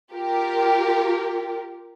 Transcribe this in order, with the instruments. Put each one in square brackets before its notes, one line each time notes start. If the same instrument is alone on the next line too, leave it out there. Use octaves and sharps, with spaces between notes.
[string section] F4 G4 A#4